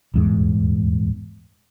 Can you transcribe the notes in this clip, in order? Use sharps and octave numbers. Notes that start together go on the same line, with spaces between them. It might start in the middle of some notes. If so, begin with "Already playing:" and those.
D#1 E2 G#2